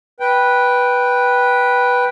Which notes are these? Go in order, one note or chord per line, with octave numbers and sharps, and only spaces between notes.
B4 G5